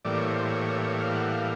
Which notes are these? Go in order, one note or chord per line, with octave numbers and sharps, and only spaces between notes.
A2 E3 G3 A#3 D5
C#5
C5
C#5
F5
F#5
F5